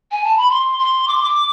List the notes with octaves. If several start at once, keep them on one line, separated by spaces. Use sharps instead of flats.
G#5
A5
B5
C6
C6
D6
C6
D6